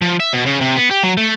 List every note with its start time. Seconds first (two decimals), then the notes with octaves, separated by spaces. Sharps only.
0.02 F3
0.20 E5
0.33 B2
0.46 C#3
0.61 C3
0.76 B3
0.91 G4
1.03 F#3
1.17 A3